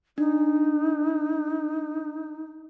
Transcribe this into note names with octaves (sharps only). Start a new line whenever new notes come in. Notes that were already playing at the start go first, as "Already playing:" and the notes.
D4 D#4